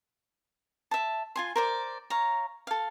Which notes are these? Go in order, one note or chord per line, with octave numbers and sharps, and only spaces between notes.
E5 A5
F4 G#5 C6
A#4 C5 D5
C#5 F5 A#5
A4 F5